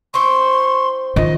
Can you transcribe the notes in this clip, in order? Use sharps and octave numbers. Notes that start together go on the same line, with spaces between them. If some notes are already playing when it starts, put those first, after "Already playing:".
C4 E4 C5 C6 C#6
D#3 F4 D#5